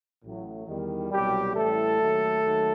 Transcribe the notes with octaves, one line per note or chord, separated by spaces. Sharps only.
A1 A2 F#3
E2 D#3 G3
C2 B2 F#3 G3 G4
A1 A2 E3 G3 A3 A4
D#2 D#3 F#3
D#2 D#3 F#3